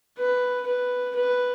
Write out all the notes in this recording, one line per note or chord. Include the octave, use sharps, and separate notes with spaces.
B4
B4
B4